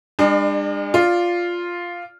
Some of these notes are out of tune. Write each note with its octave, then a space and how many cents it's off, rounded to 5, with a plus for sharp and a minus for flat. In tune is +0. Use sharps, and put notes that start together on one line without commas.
G#3 -45 D4 +30
F4 +0 D5 +0